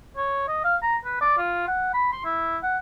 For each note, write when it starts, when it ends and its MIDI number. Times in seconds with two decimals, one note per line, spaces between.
0.17 0.48 73
0.48 0.62 75
0.64 0.76 77
0.82 0.96 82
1.05 1.16 71
1.21 1.38 74
1.38 1.67 65
1.68 1.92 78
1.94 2.11 83
2.12 2.21 84
2.25 2.57 64
2.63 2.78 78